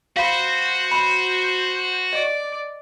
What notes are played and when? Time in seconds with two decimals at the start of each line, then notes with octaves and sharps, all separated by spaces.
0.17 F#4 C5 F5 B5
0.91 C5 B5
2.13 D5 D#5